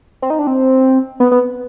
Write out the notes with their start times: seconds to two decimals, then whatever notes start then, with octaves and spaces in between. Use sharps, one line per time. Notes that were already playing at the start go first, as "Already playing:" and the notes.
0.22 C4
0.30 D#4
0.39 D4
0.47 C4
1.20 B3
1.31 B3